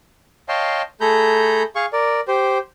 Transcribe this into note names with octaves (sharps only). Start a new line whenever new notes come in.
C#5 D#5 F5 G5 A5 C6
A3 G#4 A4 A#5 B5 G6
G#4 F5 C#6
A#4 D5
G4 C5